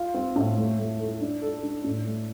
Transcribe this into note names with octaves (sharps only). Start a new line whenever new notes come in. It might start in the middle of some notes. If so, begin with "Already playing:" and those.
Already playing: F4
C4
A2
A3
A3
A4
D4
A4
D4
A2
A3